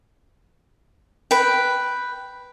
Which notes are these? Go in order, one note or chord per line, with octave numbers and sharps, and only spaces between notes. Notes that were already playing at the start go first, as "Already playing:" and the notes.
B4 G5